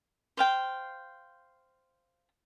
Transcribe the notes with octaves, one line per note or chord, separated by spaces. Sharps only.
C5 F5 G5